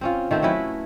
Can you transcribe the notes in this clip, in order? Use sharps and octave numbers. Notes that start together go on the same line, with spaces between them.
C4 C#4 F4
D#3 A3 C4
F#3 C#4 E4 B4